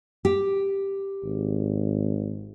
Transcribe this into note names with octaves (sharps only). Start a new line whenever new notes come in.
G4
G#1